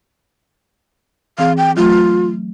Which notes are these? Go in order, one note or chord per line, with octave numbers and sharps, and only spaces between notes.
E3 C4 G#4 F5
G5
F#3 A3 F4